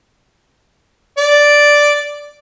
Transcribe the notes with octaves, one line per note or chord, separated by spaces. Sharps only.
D5